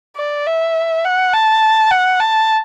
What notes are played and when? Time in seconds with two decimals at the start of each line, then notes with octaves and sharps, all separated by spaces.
0.17 D5
0.47 E5
1.05 F#5
1.34 A5
1.91 F#5
2.20 A5